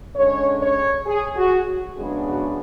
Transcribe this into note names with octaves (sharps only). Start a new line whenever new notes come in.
D3 G#3 C#4 C#5
C#5
G#4
F#4
F#2 C#3 G#3 B3 D4 G#4
F#4